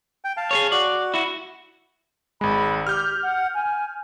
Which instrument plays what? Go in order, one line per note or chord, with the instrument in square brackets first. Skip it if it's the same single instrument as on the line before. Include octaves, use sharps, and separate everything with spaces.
[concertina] G5
F5 A5
[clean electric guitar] G#4 A4 C#5
[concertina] F#4 [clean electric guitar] D5
[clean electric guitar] E4 F#4
[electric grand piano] G#1 G#3 [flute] B5
[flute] G4 [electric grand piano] F6 G6
[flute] F#5
G#5